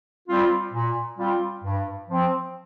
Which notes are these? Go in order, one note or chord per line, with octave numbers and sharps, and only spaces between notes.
G3 C4 F4
A#2
G3 C4 F4
G2
F3 C4